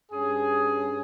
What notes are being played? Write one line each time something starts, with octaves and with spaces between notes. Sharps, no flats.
G2 C#4 G#4